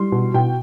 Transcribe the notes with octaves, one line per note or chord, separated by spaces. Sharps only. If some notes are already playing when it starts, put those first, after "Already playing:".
Already playing: G3 C6
B2
B2 G5